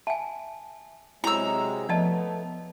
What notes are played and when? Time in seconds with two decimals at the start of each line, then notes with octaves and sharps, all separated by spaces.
0.07 E5 G#5 A5
1.24 C3 F#3 G#3 E4 A#5 E6
1.89 F3 A3 B3 D5 D#5 A5